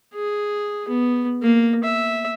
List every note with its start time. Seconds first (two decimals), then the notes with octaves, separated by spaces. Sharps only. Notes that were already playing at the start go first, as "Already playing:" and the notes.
0.14 G#4
0.88 B3
1.42 A#3
1.84 E5